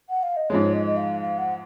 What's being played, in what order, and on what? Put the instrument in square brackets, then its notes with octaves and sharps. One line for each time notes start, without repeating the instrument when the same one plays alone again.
[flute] F#5
F5
D#5
[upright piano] G#2 F3 G#3 [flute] C#5
[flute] D#5
D#5
F5
F5
F#5